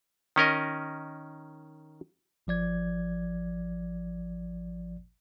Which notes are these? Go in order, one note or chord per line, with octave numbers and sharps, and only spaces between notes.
D#3 C#4 A#4 D#5
G#1 F3 D5 G#6